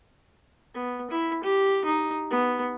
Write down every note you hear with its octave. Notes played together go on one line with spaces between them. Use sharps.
B3
E4
G4
D#4
B3